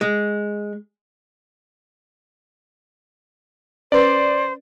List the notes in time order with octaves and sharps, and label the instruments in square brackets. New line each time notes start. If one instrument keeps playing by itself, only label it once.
[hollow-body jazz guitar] G#3
[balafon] C#4 B4 [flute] C5 [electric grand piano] D5